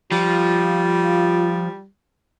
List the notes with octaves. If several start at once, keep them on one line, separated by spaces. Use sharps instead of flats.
F3 G3 F4